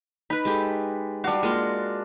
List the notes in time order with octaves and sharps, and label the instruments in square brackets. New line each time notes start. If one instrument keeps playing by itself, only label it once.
[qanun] D#4 B4 [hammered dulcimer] B5
[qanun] G#3 G4 A4
[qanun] G3 F5 [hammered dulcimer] D4 F#4
[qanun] G#3 A#3 F4